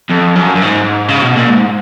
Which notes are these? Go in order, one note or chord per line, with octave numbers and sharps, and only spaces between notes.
F2
F#2
F#2
G#2
C#3
B2
A#2
G#2